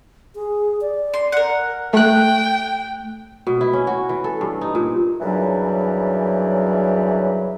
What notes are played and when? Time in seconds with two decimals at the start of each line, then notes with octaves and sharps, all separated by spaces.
0.35 G#4
0.81 D5
1.14 C6
1.32 A#4 F#5
1.93 A3 G5 F#6
3.47 B2
3.61 E4
3.73 C#4
3.87 F#4
4.09 E3
4.24 A4
4.41 G2
4.61 D#4
4.75 A#2
5.21 F#2 C#3 E3 F#3 G3 D4